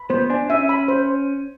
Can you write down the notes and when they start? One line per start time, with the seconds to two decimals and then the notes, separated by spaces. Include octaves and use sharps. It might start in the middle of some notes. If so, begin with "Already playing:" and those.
Already playing: B5
0.10 B3 C5
0.30 D4 G#5
0.50 C#4 E5
0.69 B5
0.88 C5